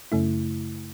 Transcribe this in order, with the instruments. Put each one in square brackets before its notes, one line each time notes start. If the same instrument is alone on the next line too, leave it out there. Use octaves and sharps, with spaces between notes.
[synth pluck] F#2 C#3 A3 E4